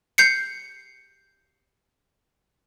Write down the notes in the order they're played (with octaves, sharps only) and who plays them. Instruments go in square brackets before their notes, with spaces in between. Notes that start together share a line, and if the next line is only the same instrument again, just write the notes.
[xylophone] G6 C7 C#7